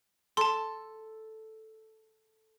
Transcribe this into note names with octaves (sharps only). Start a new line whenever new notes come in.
A4 A5 C6